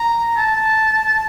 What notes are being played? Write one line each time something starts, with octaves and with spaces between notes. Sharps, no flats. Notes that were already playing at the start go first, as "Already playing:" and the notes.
Already playing: A#5
A5